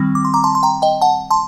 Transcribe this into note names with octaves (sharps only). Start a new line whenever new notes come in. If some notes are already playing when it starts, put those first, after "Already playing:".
Already playing: D#3 G3 C4
D6
C6
A#5 D6
A5 C6
C6
G5 A#5
D#5 G5
F#5 A5
A5 C6